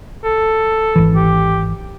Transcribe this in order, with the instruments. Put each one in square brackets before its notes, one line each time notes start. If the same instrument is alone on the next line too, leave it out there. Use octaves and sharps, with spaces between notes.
[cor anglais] A4
[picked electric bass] G#1 E3
[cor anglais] G4